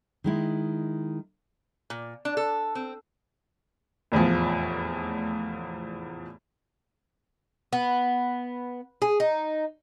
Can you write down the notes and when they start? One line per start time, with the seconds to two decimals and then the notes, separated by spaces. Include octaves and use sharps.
0.24 D#3 G#3 E4
1.90 A#2
2.25 D4
2.37 A4
2.75 C4
4.12 F1 E2 A2 F3
7.73 B3
9.02 G#4
9.20 D#4